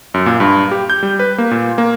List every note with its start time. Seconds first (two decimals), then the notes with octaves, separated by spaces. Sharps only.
0.14 F#2
0.26 A#2
0.40 G2
0.71 G4
0.90 G6
1.03 G3
1.19 B4
1.38 A#3
1.51 A#2
1.78 A#3